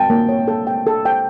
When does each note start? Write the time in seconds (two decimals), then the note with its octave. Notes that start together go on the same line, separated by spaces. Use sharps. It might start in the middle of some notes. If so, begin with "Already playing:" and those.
Already playing: G5 A5
0.10 A#3
0.29 C#5
0.48 A4
0.67 G5
0.87 A4
1.05 G5